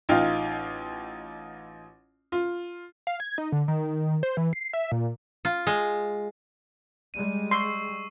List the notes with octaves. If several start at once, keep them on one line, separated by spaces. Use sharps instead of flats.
A1 D#4 F4 F5 G5
F4
F5
G#6
D#4
D3
D#3
C5
E3
C7
E5
A#2
F4
G#3
G3 G#3 D#7
C6 C#6 E6 C7